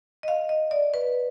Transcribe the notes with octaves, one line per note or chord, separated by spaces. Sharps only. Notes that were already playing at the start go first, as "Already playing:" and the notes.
D#5
F5
D#5
D5
B4